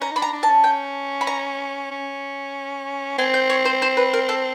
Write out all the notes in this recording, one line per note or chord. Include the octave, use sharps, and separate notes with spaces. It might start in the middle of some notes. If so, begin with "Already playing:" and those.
C#4 A#5
D#4
D4 B5
A#5
D4
A5
C#4
G5
B5
A#5
C#4
C4 G#5
G5
C#5
C5
C5
B4
A#4
A4